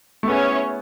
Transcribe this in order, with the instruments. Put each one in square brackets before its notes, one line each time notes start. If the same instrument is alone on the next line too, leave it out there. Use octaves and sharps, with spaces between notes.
[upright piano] A3
[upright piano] B3 [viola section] C#4 E4 G#4 C#5